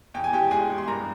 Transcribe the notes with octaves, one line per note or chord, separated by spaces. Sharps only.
E2 G5
G#5
E2 G4 G5
G#3 G#4 G#5
E2
C6
G2 A#4 A#5